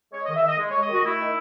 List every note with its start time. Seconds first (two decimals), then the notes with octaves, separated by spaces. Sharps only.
0.12 G#3 C#5
0.24 D#3 D#5
0.35 E5
0.43 D#3 D#5
0.58 G#3
0.70 G#3 C#5
0.81 D#5
0.88 D#3 F#4
1.03 A3 E4
1.19 D#3